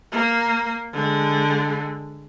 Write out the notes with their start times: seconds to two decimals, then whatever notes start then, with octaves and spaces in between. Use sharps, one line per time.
0.12 A#3
0.93 D3 G#3